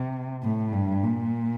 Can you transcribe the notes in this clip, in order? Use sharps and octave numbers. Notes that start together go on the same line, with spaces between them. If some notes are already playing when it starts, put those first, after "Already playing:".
Already playing: C3
A2
G2
A#2